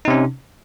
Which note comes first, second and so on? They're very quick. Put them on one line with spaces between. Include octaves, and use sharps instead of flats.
D#4 C3 C#4